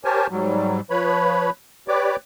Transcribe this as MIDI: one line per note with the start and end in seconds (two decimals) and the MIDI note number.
0.05 0.27 67
0.05 0.27 70
0.05 0.27 72
0.05 0.27 73
0.05 0.27 80
0.05 0.27 81
0.30 0.80 44
0.30 0.80 54
0.30 0.80 55
0.90 1.50 53
0.90 1.50 71
0.90 1.50 73
0.90 1.50 83
1.88 2.16 67
1.88 2.16 71
1.88 2.16 73
1.88 2.16 74
1.88 2.16 86